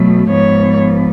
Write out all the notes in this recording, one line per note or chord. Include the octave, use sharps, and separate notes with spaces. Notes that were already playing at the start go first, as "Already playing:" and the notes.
Already playing: B2 F#3 A3
G#2 F3 B3 C#5